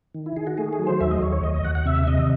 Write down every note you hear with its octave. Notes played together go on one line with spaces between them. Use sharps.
D#3
E4
D#3 G#4
F#4
A3 G#4
G#4
F#3
C5
D#2 E5
D#5
D#2 C#5
C#5
D#2 D#5
D#5
D#2 F#5
F#5
C3 E5
C3 D#5